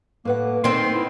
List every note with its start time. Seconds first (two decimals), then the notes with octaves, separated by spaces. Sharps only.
0.25 A2 A#3 B4 F#5
0.64 D#3 C4 C5 D5 F#5 C6
0.94 E4